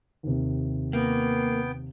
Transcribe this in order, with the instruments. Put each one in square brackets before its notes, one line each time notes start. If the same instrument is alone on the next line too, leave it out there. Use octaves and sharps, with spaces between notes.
[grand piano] D#2 C3
[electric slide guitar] A#3 [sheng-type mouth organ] B3 G5